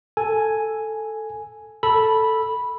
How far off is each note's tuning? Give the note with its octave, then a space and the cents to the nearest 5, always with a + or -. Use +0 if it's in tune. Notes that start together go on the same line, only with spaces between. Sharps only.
A4 +0 G#5 +0
A4 +0 B5 -10